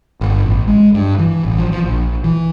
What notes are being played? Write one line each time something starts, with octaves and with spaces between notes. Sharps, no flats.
G1
A1
G#3
G2
E3
A1
F3
F3
A#1
E3